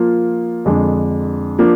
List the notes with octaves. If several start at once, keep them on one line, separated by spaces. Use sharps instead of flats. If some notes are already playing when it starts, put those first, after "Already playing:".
Already playing: F3 A#3 F4
F2 D3 G#3 D4
F3 A#3 D4